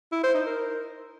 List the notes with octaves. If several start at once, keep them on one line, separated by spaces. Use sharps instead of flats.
E4
C5
D#4
A#4